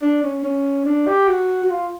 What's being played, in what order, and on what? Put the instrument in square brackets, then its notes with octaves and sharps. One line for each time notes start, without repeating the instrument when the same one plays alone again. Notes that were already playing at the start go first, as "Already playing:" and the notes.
[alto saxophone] D4
C#4
C#4
D4
G4
F#4
F#4
F4